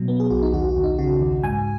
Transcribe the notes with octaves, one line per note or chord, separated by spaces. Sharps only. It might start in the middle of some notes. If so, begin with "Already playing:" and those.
Already playing: B2 F#3
B3
G#4
B1 F#4
D#4
D#2 F#4
F#4
D#2
D#4
C#3 F#4
D#2
G#2 G#5